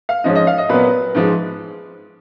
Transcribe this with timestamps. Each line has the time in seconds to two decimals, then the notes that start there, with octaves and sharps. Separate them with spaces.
0.09 F5
0.24 G#2 F3 G#3 C#4 D#5
0.35 D#5
0.47 F5
0.58 D#5
0.69 A#2 F#3 B3 B4
1.15 G#2 F3 G#3